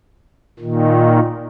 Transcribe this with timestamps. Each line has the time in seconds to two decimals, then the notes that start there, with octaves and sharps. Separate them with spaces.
0.59 A#2 D#3